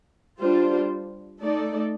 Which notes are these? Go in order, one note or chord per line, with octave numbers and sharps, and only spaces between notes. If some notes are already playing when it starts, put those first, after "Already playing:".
G3 D4 F4 C5
A3 D#4 A4 D5